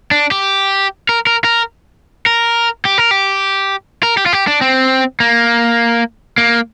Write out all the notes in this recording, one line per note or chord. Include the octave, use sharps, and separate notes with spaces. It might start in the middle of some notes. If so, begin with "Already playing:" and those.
D4
G4
A#4
A#4
A#4
A#4
G4
A#4
G4
A#4
G4
F4
G4
D4
C4
A#3
A#3